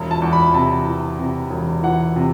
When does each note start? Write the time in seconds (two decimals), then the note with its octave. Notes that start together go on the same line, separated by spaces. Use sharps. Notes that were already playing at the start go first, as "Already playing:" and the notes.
Already playing: E1
0.11 A5
0.22 E2
0.33 B5
0.46 B5
0.54 C3 A5
0.86 E3
1.18 C3
1.50 E1
1.83 E3 F#5
2.16 C3